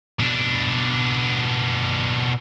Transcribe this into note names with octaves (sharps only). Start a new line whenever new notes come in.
B2 D4